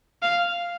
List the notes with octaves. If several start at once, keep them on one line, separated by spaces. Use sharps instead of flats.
F5